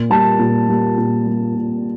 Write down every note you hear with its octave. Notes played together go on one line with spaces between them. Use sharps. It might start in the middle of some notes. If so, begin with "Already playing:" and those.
Already playing: A#2
G3 A5
A#2
G3
A#2
G3
A#2